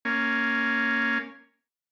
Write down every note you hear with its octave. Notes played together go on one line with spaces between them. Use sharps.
A#3 C#4